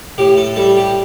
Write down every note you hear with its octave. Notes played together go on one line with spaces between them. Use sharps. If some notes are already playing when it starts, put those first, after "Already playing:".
A2 G4
A4
G3 A4
G4